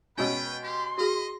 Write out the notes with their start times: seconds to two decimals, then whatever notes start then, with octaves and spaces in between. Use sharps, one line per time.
0.18 B2 G#3 C#4 B4 G5
0.63 G4 C6
0.98 F#4 G#4 D#5